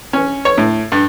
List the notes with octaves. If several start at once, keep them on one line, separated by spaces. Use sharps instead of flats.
C#4
C#5
A2
G2